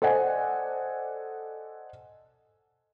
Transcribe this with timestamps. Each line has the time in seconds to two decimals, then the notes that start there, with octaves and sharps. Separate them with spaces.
0.02 A4 C5 D5 D#5 F#5 G#5